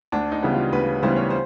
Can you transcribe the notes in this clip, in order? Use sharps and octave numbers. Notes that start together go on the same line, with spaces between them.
D2 D4
D#4
C#3 E3 G3 B3
F4
D2 B4
C#3 E3 G3 B3 C5
C#5
C5